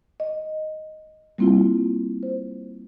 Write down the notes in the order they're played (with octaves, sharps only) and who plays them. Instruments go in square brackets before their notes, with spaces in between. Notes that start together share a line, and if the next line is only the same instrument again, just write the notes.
[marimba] D#5
G3 A#3 C4 E4 F4
C5